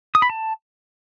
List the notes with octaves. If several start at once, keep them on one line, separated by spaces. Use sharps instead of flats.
D#6
B5
A5